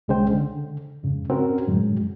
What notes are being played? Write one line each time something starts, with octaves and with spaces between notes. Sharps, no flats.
C2 D3 G#3 C#4 C5 G5
D3
F2 G#2 C#3
C4 C#4 F#4 A#4
F#2 A2 D3 F#3 G#3